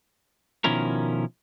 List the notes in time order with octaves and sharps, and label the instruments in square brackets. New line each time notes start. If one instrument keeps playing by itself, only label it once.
[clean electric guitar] B2 D#3 F3 C#4 E4 A#4